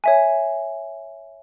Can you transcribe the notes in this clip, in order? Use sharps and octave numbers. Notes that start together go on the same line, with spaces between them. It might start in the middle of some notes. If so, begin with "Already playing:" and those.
C#5 E5 G#5